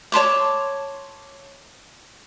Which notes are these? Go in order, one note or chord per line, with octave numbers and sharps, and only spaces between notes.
C#5 A5 C6 D6